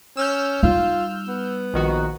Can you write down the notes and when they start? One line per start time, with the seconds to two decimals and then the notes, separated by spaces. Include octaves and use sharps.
0.17 C#4 E6 F6 G6
0.63 G3 D#4 F4
1.28 B3
1.74 A#1 D#3 F#4